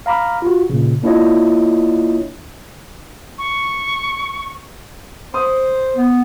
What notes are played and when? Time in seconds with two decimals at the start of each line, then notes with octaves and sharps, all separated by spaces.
0.06 F5 A#5 B5 D6 F6
0.42 F4 F#4
0.70 A#2 C#3
1.03 A#3 D4 E4 F4 C#5 D#5
3.38 C#6
5.34 C5 C6 D#6
5.96 B3